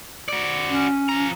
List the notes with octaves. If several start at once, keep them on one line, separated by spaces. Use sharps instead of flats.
F#4 D5
C#4
F3 A#5